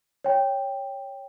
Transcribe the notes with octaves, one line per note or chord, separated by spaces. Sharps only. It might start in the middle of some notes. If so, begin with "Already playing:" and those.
C#5 G5